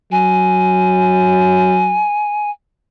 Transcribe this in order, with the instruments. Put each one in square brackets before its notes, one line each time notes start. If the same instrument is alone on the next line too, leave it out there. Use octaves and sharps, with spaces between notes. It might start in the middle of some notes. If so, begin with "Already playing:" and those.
[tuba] F#3 [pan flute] G#5